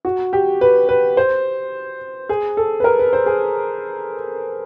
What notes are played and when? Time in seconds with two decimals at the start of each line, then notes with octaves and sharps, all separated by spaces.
0.05 F#4
0.33 G4
0.61 B4
0.89 B4
1.17 C5
2.29 G#4
2.57 A4
2.80 B4
2.84 A#4
2.99 B4
3.13 C5
3.26 G#4